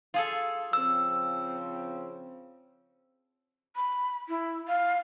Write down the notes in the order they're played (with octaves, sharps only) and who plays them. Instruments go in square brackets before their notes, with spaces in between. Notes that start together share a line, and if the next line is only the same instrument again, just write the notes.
[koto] F4 G#4 A4
[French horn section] C#3 F3 C4 [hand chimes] E6
[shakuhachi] B5
E4
F5